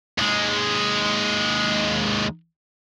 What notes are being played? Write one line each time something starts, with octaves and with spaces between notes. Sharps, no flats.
D#2 G#3